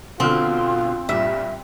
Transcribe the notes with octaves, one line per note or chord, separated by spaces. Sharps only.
B2 D3 C4 F4 F6
G2 A#2 E5